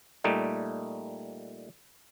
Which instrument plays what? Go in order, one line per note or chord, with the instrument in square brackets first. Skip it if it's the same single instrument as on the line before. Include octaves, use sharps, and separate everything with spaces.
[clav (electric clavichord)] A#2 G3 A3 D#4